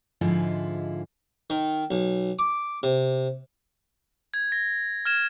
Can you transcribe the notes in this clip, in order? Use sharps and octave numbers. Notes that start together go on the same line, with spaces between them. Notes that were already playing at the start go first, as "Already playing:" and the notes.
G#2 D3 F3 G#3 E4 F4
D#3
B1
D6
C3
G#6
A#6
F6 G#6 E7